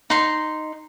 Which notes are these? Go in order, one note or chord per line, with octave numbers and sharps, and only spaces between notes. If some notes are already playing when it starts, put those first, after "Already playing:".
D#4 C6